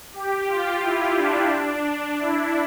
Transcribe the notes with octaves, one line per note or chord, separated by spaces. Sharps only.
G4
F4
E4
D4
D4
E4